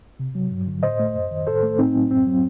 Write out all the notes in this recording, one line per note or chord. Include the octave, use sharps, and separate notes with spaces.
C3
F#3
G2
D3
A2 C5 D#5
A3
F#2
D#3
A2 A4 C5
A3
A2 C4 D#4
F#3
F#2 C4
F#3